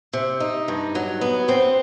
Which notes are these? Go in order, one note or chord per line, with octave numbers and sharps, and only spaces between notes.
C3
D#4
G2
F#3
B3
C4